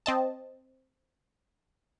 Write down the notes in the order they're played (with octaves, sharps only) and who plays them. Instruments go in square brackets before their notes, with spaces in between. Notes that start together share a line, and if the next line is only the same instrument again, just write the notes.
[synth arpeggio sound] C4 D#5 A5